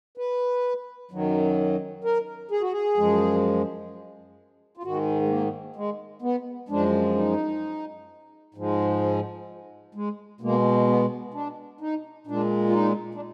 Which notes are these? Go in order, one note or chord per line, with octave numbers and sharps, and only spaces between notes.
B4
F#2 D#3 F#3
A#4
G#4
F#4
G#4
F#2 F3 G#3
F4
G#2 D#3 G#3 F#4
G#3
A#3
G#3
B3
F#2 F3 G#3 D4
D#4
G#2 F3 G#3
G#3
B2 G#3 A#3
B3
D4
D#4
A#2 G#3 D4
F4
D#4
D4